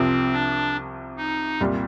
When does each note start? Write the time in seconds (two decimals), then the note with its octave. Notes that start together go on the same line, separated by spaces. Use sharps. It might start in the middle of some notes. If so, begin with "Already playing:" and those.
Already playing: C2 C3 F3 C4
0.32 D4
1.17 D#4
1.61 C2 A#2 G3